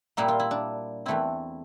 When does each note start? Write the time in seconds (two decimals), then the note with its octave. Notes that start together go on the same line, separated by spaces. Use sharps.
0.17 A#2 G3 A#3 E4
0.28 F4
0.40 E4
0.51 D4
1.06 E2 E3 A3 C4 E4